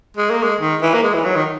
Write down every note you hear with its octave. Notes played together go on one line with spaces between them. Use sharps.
G#3
A#3
G#3
D#3
E3
A#3
G#3
E3
F#3
D#3